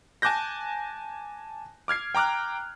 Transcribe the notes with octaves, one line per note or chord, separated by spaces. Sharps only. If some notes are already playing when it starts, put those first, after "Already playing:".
G#5 A5 D6 F#6 G6 A#6
D6 F6 G#6 C7
G5 A#5 D6 F6 F#6